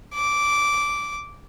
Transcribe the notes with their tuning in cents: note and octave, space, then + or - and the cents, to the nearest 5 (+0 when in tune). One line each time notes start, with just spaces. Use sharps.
D6 -10